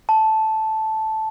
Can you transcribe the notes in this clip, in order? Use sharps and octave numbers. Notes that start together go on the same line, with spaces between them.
A5